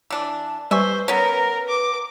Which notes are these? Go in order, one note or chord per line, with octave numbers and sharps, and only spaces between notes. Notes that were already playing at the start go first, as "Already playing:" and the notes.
E3 D4
G3 B4 C5 E5 G#5 C#6
B3 C#4 A#4
D6